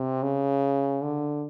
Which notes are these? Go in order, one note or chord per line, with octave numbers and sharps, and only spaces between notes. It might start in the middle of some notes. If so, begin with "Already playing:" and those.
Already playing: C3
C#3
D3